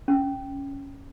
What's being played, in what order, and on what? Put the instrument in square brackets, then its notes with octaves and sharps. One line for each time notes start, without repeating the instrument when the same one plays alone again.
[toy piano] C#4